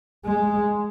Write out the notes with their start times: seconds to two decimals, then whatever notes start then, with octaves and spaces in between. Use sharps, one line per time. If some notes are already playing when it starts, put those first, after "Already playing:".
0.25 G#3